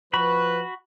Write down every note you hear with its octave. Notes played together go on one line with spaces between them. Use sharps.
F3 F#4 B4 B5